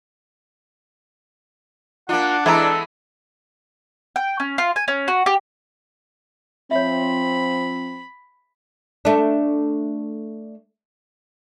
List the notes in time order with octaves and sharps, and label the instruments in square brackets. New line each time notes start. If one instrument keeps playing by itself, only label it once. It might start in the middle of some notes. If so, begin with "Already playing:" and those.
[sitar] A#3 F4 [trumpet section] D4 [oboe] F#5
[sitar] E3 G#3 B3 [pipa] E4 A#5 [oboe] A4
[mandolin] G5
C#4
F4
G#5
C#4
F#4
G4
[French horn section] F3 C4 [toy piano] C#5 E5 [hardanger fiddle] B5
[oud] A3 D4